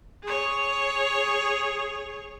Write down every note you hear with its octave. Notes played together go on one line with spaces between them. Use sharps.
G#4 C#5